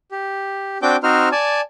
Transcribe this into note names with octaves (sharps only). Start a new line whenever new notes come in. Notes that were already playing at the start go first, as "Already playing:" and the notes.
G4
C4 D4 F#4 G5 D6 G6
C4 D#4 F#4 C5 F6
D5 G#5 A5